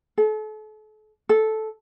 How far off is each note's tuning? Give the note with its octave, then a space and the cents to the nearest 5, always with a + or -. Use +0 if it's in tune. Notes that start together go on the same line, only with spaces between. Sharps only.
A4 -40
A4 -10